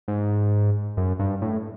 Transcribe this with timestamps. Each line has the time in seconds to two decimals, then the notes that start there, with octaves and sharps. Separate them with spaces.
0.08 G#2
0.97 F#2
1.19 G2
1.42 A2